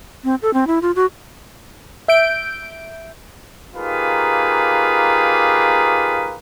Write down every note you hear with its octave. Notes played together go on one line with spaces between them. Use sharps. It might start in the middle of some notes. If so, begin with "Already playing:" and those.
C4
A4
C4
E4
F4
F#4
E5 G6 D7
A#3 D#4 F4 G4 G#4 B4